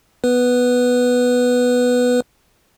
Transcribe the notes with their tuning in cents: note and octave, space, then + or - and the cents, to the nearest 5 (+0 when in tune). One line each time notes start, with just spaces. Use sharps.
B3 +0 B4 +0